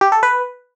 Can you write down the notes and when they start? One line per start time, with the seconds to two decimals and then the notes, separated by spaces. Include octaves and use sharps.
0.01 G4
0.12 A4
0.23 B4